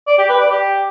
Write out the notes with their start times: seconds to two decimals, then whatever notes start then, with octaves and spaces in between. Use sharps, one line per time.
0.07 D5
0.18 G4
0.29 B4
0.40 D5
0.51 G4